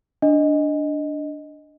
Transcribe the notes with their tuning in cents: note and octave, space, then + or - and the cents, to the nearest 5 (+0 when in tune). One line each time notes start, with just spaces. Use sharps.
D4 +0 D#5 +0